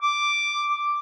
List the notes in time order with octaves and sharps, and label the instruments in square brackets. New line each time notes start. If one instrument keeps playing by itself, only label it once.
[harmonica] D6